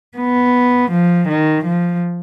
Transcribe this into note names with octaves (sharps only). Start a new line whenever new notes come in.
B3
F3
D#3
F3